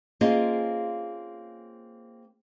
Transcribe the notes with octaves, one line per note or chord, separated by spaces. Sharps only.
A#3 C4 C#4 F4 G#4 D#5